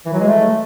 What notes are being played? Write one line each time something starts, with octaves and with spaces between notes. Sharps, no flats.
E3
F#3
G#3
A3